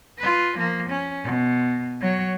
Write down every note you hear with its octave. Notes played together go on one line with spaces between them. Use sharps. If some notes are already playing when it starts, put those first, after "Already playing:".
F4 B4
F3 A#3
C#4
B2
F#3 C#5